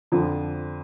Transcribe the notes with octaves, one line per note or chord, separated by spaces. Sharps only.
F2 D3 F3